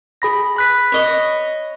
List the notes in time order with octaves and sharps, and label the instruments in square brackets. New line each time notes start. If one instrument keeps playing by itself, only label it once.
[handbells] G#4 B5 A#6
B5 F#6 B6
[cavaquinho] C#5 D#5